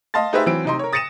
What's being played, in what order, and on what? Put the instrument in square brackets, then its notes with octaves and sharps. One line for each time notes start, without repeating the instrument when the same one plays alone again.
[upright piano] D#5 F5 A5 C6 A6
D#4 G4 G#4 B4 C5 E5
E3 F#3 C4 E6 D7
C3 D#4 C6
A#4 C#5
D#6 A6 A#6 C#7 D#7 E7